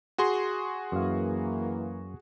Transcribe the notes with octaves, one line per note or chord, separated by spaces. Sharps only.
F#4 G#4 C6
F#2 E3 A#3 F5